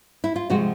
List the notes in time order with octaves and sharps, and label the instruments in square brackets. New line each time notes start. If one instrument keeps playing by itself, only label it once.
[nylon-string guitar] E4
F4
C3 F3 G#3 F#4